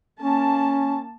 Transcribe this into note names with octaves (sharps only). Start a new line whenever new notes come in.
A#3 C#4 A5